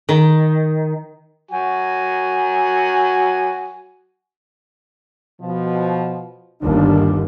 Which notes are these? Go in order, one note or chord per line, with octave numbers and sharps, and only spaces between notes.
D#3
F#3 F#4 G#5
B2 F3
G1 D#2 D4